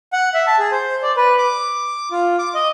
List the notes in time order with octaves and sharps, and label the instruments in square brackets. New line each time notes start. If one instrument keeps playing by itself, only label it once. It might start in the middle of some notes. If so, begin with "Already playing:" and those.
[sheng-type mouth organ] F#5
E5
A5
G#4
C5
D5
B4
D6
F4
D6
D#5